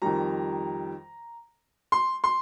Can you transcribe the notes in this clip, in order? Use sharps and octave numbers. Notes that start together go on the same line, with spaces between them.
F2 D#3 G3 A#5
C6
C6